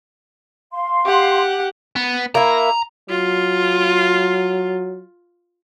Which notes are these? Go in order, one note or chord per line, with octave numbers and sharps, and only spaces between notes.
F5 C6
G4 F#5
B3
A#3 E4 A#5
F#3 F4